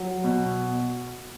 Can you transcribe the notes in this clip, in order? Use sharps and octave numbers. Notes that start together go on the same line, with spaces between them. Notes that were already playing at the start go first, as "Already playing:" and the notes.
Already playing: F#3
B2